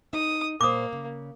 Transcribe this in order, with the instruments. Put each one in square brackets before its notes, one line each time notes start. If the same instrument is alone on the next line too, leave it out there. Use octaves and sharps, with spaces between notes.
[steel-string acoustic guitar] D#4 [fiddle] D#6
[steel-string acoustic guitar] A#2 C5 [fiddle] A#3 [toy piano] D6 D#6
[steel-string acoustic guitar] C#3